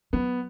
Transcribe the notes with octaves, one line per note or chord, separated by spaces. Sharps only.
F#3 B3